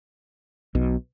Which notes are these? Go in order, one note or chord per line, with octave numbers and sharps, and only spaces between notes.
B1 B2